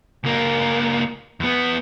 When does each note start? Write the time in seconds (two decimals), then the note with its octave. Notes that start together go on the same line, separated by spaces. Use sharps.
0.24 C#2 A#3
1.40 E2 B3